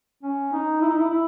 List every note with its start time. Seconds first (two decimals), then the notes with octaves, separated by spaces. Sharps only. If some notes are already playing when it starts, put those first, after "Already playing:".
0.23 C#4
0.53 D#4
0.81 E4
0.90 D#4
0.99 E4
1.10 E4